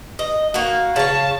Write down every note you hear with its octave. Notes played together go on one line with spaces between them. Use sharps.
D#5
A#3 F#4 F5
C#3 C#5 A5